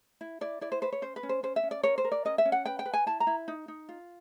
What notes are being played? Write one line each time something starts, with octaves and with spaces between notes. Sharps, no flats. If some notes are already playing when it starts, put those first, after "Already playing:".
E4
E4 D5
E4 D5
C5
B4 C5
C#5
C#4 C5
B4
C#4
C5
C#4 C5
E5
C#4
D5
A#4 C#5
C5
A#4
D5
C#4 D#5
E5
C#4
F#5
B4 G5
G5
B4
G#5
E4 A5
A#5
E4
D#4
D#4
F4